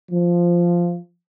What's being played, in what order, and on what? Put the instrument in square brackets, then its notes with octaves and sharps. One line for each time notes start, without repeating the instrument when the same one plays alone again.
[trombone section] F3